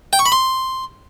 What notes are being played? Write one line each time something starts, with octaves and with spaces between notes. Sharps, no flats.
G5
C#6
B5
C6